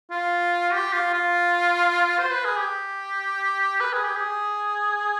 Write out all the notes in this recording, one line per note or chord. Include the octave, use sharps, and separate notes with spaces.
F4
G4
F4
F4
C5
B4
G#4
G4
B4
G#4
G4
G#4